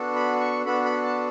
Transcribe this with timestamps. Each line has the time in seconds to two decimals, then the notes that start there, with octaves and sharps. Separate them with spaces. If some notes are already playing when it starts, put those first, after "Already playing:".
Already playing: B3 D4 F#4 A4
0.16 B5
0.40 C#6
0.65 B3 D4 F#4 A4 B5
0.85 B5
1.04 A5